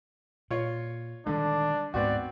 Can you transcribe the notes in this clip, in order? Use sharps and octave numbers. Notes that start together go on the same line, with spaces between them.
A#2 F4 C#5
D3 D#3 G3 G#3 D4
D2 G#2 G#3 B3 C4 F#4 D5